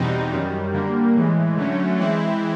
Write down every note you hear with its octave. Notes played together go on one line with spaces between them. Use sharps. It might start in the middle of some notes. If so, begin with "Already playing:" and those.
Already playing: E2 B2 G3 C4 D#4
F#2 D#3 G3
D3 G3 A#3
A2 E3 G#3
D3 F#3 A3 C#4
E3 G#3 C4 E4